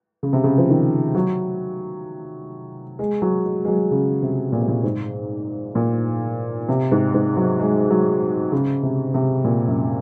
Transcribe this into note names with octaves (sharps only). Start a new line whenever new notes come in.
C#3
C3
C#3
F3
D#3
F#3
G#3
F#3
G#3
G#3
F#3
C#3
C3
A#2
C3
A#2
G#2
A#2
C3
G#2
G#2
F#3
G#3
F#3
C#3
C3
C3
A#2
F#2